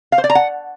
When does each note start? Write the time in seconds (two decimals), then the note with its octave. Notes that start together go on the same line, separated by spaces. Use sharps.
0.12 F5
0.18 C5
0.24 D5
0.30 A#5
0.35 F#5